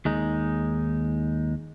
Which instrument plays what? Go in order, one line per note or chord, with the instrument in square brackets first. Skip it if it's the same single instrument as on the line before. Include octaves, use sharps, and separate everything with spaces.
[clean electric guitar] D#2 G#3 D#4